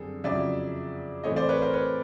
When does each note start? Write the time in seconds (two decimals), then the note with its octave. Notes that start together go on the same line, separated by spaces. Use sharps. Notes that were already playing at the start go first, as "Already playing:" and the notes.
Already playing: F#2 D3 G3 C4 G#4 A4
0.24 F2 C#3 F#3 D5 E5
1.24 A2 E3 A3 C4 C#5 D#5
1.36 C5 D5
1.49 B4 C#5
1.62 A#4 C5
1.73 B4 C#5